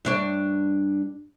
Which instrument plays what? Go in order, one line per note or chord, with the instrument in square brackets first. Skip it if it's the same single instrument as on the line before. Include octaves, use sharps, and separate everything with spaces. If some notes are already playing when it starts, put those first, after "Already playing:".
[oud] G2 D4 C#5